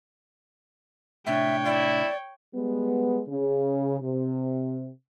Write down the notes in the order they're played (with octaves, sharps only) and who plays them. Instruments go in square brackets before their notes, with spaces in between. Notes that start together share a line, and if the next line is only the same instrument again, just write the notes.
[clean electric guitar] A2 C3 D4 [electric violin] C#5 G5 [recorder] E5
[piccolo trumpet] E4 [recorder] D5
[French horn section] G3 G#3 B3
C#3
C3